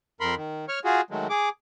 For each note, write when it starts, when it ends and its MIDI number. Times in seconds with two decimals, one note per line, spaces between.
0.21 0.35 41
0.21 0.35 70
0.21 0.35 83
0.21 0.35 84
0.36 0.65 51
0.69 0.79 73
0.69 0.79 85
0.69 0.79 89
0.85 1.01 65
0.85 1.01 66
0.85 1.01 68
1.10 1.27 51
1.10 1.27 54
1.10 1.27 56
1.10 1.27 57
1.30 1.49 68
1.30 1.49 86